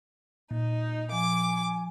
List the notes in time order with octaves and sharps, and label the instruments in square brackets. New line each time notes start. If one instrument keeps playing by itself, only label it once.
[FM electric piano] A#2 [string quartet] D#4
[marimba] F3 [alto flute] G#5 [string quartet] D6